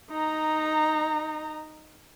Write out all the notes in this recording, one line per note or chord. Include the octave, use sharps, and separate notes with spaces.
D#4 A#5